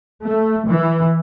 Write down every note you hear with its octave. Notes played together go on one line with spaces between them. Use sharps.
A3
E3